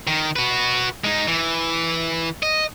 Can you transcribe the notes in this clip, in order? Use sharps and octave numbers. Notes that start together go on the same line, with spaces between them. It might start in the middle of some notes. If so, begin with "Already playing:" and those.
D#3
F#4 B4
G#3 D#4
E3
D#5